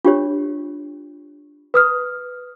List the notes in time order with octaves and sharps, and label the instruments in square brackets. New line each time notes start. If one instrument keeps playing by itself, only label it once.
[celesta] D4 [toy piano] F4 G4 C#5
[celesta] B4 D#6 F6